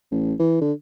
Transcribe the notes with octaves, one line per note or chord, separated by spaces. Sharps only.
A1
E3
D3